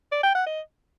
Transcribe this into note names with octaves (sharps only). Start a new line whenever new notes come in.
D5
G5
F#5
D#5